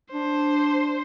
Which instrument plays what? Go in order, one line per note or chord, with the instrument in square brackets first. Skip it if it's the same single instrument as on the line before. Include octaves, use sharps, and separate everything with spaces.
[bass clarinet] D4 [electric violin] C5